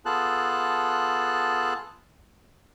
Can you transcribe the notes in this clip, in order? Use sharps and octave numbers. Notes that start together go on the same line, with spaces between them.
B3 F4 G#4 A4 A5 F#6